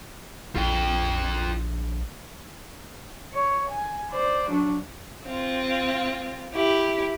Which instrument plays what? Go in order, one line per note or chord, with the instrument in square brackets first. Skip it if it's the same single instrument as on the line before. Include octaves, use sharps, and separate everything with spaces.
[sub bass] A#1 [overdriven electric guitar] F4 G5
[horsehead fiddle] C#5
G#5
C5 D5
F#3 D4
[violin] C4 F4
E4 G4